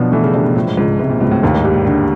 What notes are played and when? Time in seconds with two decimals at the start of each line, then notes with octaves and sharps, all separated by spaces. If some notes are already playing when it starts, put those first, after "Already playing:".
Already playing: B2 F3 F#3 B3 D4
0.12 E3 A3
0.24 C#3
0.33 C3 D4
0.44 B2
0.55 A2 F3
0.67 G#2
0.77 C#2 G#2
0.99 G#2 C3
1.10 A#2
1.20 C#2 B2
1.31 A2
1.43 D#2 A2
1.54 G#2
1.64 G2 G3
1.75 A2
1.86 A2 D3